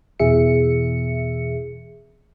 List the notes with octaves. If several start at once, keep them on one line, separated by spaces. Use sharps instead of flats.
E2 B2 E3 G#4 E5 C#7